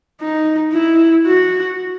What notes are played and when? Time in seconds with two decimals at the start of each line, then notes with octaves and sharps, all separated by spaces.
0.21 D#4
0.73 E4
1.26 F#4